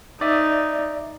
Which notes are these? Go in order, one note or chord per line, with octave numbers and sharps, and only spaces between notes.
D#4 D5 E5